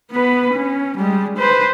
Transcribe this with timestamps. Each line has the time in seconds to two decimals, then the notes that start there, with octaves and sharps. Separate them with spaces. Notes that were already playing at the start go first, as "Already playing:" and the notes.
0.11 B3 B4
0.53 C#4
0.97 G3 G#3
1.38 B4 C5